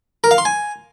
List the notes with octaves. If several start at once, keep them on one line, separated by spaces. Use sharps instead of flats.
A#4
F5
C6
G#5